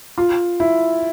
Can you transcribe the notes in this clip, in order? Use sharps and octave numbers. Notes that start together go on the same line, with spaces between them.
F4
E4